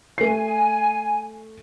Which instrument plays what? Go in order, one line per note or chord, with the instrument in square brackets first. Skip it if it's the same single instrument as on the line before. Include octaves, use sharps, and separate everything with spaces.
[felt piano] A3 C7 [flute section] G#5